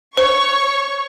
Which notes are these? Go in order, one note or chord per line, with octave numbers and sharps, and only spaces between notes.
C5 C#5 C#6